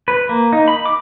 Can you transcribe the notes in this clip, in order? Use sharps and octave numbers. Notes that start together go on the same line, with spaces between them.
B4
A#3
D#4
B5
D6